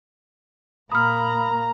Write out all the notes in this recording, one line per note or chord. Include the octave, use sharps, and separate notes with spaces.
A#2 A#3 A#5 B5 D#6 F6